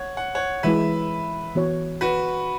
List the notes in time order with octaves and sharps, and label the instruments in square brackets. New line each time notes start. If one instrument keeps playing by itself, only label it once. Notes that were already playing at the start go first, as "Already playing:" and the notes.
Already playing: [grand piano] C#5 F#5
F#5
C#5 F#5
[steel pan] E3 G#3 E4 [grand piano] B4 E5
[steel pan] E3 B3 F#4 C#5
[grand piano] F#4 B4